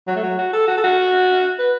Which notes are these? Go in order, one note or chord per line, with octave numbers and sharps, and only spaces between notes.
F#3
A3
F#3
F#4
A4
F#4
A4
F#4
B4